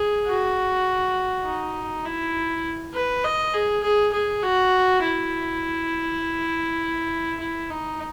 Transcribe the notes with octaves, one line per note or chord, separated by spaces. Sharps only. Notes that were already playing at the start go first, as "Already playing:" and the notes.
Already playing: G#4
F#4
D#4
E4
B4
D#5
G#4
G#4
G#4
F#4
E4
E4
D#4